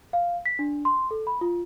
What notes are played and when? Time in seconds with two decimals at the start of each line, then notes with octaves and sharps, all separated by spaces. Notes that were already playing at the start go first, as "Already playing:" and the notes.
0.13 F5
0.46 B6
0.59 D4
0.85 C6
1.11 A4
1.27 B5
1.41 F4